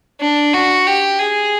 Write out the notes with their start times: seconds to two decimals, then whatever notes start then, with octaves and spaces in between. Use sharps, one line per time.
0.20 D4
0.54 F#4
0.87 G4
1.19 G#4